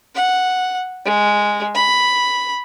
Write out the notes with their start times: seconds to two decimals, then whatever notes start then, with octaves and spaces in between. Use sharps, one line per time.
0.15 F#5
1.05 G#3
1.75 B5